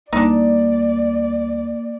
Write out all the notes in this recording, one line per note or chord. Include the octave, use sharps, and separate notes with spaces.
D2 G3 A#3 D4 D#4 D5